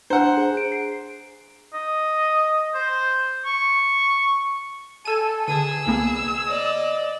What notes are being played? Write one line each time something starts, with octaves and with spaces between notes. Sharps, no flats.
D4 C5 F#5 A#5
G#4
D7
C7
D#5
C5
C#6
A4 G#5 E6 D#7
D3 G#4 A5 E6 D#7
C2 A#3 B3 G#4
D5 D#5